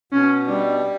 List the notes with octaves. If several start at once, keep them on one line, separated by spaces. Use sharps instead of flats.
B2 C#4
G3 D4